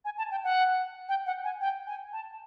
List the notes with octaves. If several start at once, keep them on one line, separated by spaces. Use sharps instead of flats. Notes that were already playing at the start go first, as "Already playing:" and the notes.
G#5
A5
G5
F#5
G5
F#5
G#5
G5
G#5
A5